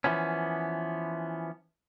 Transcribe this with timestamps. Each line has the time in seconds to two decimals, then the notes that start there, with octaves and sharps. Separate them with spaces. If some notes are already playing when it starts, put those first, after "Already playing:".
0.04 E3 F3 B3 C#4